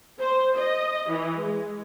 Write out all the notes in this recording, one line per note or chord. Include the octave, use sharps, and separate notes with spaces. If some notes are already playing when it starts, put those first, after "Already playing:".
C5
D#5
E3
G#3